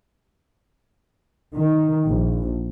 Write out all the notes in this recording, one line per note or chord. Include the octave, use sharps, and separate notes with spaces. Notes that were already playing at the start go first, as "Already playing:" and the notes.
D#3
A#1